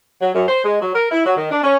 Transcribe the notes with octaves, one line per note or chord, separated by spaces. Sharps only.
F#3
F#2
C5
G#3
F#3
A#4
E4
F#3
D#3
D4
C#4